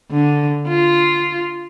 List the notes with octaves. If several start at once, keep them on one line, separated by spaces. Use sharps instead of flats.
D3
F4